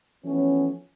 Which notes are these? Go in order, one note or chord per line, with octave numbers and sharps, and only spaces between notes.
E3 F3 A3 B3 C#4